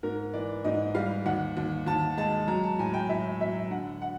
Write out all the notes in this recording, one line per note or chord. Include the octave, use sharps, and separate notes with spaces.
G#2 A#4
E3 D5
G#2 D#5
G3 F5
D#2 F#5
D#2
D#2 A5
G#3 A5
F#3 A#5
A5
A2 G#5
G5
A2 E5
F#3 E5
D3 F#5
F#5